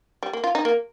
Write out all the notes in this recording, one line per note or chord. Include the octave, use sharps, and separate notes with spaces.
G3
A#3
F4
D#4
A#3